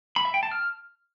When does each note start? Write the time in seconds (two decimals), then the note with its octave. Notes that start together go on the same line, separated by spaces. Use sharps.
0.16 B5
0.25 E5
0.34 G5
0.43 A5
0.51 F6